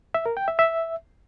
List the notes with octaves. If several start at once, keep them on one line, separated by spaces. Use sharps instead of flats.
E5
A#4
G5
E5
E5